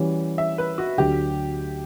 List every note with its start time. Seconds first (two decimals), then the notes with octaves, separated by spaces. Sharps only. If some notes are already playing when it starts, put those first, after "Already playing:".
Already playing: E3 G3 C#4 F#4 C#5
0.38 E5
0.58 B4
0.78 F#4
0.97 D2 D3 F#3 G4